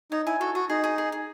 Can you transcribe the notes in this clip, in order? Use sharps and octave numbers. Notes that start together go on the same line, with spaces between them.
D#4 C#5
E4 G#5
F#4 A4
F#4 D#6
D#4 G#4
G#4
G#4
G#4